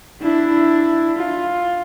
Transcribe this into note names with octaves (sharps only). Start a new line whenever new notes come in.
D4 E4
F4